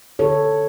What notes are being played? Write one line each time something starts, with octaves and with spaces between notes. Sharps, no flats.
D3 A4 C#5